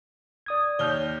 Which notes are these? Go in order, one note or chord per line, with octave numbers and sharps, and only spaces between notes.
D5 D#6 G#6
D#2 C#5 F6 G6 G7